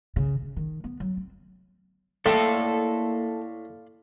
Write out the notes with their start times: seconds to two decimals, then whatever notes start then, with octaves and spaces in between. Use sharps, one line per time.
0.16 C#3
0.42 C#3
0.56 D#3
0.84 B3
1.00 F#3
1.17 C4
2.26 A2 A#3 A4 D5 F5 G5 A5 C6